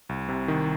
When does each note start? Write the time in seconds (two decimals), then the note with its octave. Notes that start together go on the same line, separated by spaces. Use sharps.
0.09 C2
0.29 C3
0.48 D#3